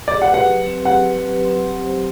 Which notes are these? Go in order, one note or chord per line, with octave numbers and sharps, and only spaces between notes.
G4 D5
F#5
B4
F#5
F#3
C4
G4 F#5
B4
F#3
C4
G4
C5